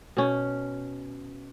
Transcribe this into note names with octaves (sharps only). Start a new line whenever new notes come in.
B2 C#4